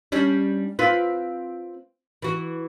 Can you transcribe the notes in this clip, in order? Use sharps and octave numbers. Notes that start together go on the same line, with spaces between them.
G3 C#4 D4
C4 F4 B4
E3 F#4